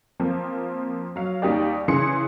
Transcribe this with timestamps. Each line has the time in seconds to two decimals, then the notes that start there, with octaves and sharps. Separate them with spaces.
0.20 F3 A#3 C4
1.16 F#3 F5
1.42 D#2 G3 D#4 G4 D5
1.88 C#3 E3 G#4 C6 C#7